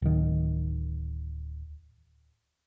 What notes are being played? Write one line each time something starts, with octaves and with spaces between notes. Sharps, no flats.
D1 D#3